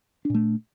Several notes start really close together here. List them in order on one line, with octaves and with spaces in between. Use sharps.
D4 A#2 A3